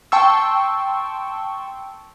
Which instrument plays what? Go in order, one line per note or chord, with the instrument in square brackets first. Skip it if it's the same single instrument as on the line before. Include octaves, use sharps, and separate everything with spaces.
[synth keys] G5 A5 C6 C#6 E6